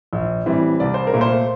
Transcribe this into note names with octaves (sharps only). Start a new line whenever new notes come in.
A#1
A2 E3 G3 C4
C2 D5
C5
A#4
A#2 A3
C5